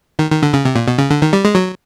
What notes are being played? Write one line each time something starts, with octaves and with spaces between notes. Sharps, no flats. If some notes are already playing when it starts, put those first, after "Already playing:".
D#3
D#3
D3
C#3
C3
A#2
B2
C#3
D3
D#3
G3
G#3
F#3